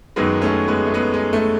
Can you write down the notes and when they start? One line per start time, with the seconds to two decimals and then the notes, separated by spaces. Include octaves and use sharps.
0.16 F#2 D#3 F#3 G#3 B3
0.42 A3 C#4
0.68 G#3 B3
0.86 A3
0.94 G#3 B3
1.14 G#3
1.33 A3